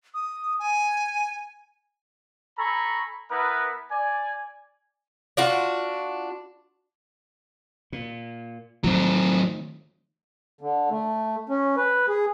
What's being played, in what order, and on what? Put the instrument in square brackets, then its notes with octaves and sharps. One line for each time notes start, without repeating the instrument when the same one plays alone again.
[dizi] D#6
G#5
[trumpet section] A4 G#5 A#5 B5 C#6
B3 E4 A#4 B4
D5 G#5
[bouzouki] D4 F4 F#4
[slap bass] A#2
[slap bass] D#3 F3 A3 [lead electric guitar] F#3 C4
[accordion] D3
A3
C#4
B4
G#4